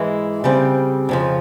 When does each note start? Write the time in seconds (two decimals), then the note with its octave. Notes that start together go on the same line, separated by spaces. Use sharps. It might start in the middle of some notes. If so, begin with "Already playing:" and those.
Already playing: G#2 E3 G#3 E4
0.44 C#3 G3 C4
1.09 F2 C#3 F3